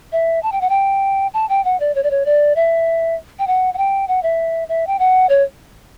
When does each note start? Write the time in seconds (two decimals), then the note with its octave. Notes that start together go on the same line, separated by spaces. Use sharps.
0.12 E5
0.43 A5
0.52 G5
0.61 F#5
0.69 G5
1.34 A5
1.49 G5
1.65 F#5
1.80 D5
1.95 C#5
2.03 D5
2.11 C#5
2.26 D5
2.56 E5
3.39 G5
3.47 F#5
3.74 F#5
3.78 G5
4.08 F#5
4.23 E5
4.69 E5
4.87 G5
4.99 F#5
5.29 C#5